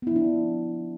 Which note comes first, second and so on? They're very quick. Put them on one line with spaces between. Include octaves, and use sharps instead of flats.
B3 E4 F3 D4